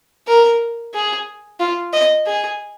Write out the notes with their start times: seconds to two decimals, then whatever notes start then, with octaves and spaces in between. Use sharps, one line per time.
0.27 A#4
0.94 G#4
1.60 F4
1.93 D#5
2.26 G#4